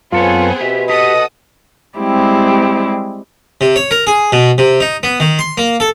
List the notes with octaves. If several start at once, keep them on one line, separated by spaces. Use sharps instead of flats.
F#2 B3 C4 F4 G#4 A4 C#5
B2 G4 E5
G4 A4 D#5 F#5 D#6
G3 G#3 C4 E4 G4
C3
C#5
A#4
G#4
B2
C3
D#4
B3
D#3
C6
A#3
A4